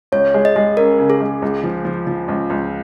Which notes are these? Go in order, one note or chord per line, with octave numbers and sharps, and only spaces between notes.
C#2 C#5
G#3
D#5
G#3
C#4 A#4
C#3
G#4
G#3
C#2
F3
F3
F3
C#2
C#2